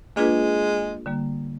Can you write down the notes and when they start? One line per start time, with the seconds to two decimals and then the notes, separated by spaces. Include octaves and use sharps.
0.16 G#3 A#3 D4 F4 G#4 B4
1.06 D3 G3 A#3